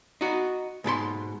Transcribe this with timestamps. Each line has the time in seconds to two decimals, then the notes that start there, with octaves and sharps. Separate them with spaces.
0.21 D#4 F#4
0.84 G#2 B2 A4 C6